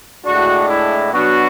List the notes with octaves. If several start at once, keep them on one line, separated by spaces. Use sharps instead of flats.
A2 G#3 D4 F#4
E4
B2 F#3 B3 D4 F#4